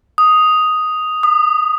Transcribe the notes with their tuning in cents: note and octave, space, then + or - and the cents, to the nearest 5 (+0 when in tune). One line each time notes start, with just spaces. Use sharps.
D#6 +0
D#6 -35